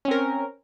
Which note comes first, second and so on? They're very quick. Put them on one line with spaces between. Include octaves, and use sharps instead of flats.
C#4 C4 A#4